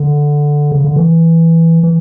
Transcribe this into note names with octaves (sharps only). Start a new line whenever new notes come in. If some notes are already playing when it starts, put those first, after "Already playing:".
Already playing: D3
C#3
D3
E3
E3